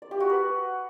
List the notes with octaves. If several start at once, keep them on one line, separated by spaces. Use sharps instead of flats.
D5
G4
F#4
B4